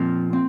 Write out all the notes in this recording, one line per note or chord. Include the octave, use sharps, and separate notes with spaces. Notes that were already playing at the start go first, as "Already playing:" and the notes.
Already playing: A#2 F3 C4 F4 A#4
C4